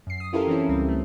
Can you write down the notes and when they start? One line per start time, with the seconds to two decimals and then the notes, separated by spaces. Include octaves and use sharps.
0.07 F#2 C7
0.20 D#6
0.33 C#4 E4 F4 G4 A4 A#4
0.48 E3 C4 C#4 E4
0.69 C#2 G3 C4
0.89 A3